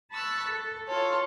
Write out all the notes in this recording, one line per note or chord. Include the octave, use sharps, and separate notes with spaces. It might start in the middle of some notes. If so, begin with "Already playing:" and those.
A5 B5 C#6 E6 F#6
A4
F4 A4 C#5